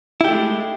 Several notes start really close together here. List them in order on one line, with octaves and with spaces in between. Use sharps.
E4 G4 A3 G#3